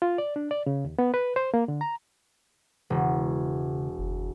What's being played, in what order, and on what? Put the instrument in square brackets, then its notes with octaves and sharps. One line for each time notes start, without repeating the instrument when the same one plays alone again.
[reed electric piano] F4
D5
D4
D5
C#3
D#2
B3
B4
C5
A#3
D3
A#5
[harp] E1 [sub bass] C#3
[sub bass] F#1